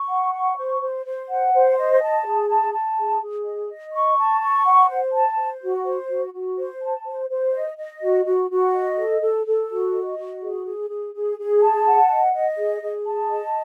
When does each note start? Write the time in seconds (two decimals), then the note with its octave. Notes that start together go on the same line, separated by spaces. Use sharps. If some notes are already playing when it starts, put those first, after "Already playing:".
Already playing: C#6
0.09 F#5
0.34 C#6
0.57 C5
0.81 C5
1.06 C5
1.29 F#5
1.53 C5
1.77 D#5
2.02 A5
2.25 G#4
2.49 A5
2.73 A5
2.98 G#4
3.21 G#4
3.45 D#5
3.70 D#5
3.93 C#6
4.17 A5
4.41 C#6
4.65 F#5
4.89 C5
5.13 A5
5.37 C5
5.62 F#4
5.85 C5
6.09 F#4
6.33 F#4
6.57 C5
6.82 A5
7.06 C5
7.29 C5
7.53 D#5
7.77 D#5
8.01 F#4
8.25 F#4
8.50 F#4
8.74 D#5
8.97 A4
9.22 A4
9.46 A4
9.70 F#4
9.94 D#5
10.18 F#4
10.41 G#4
10.66 G#4
10.89 G#4
11.14 G#4
11.38 G#4
11.62 A5
11.86 F#5
12.10 D#5
12.34 D#5
12.58 G#4
12.81 G#4
13.06 A5
13.29 D#5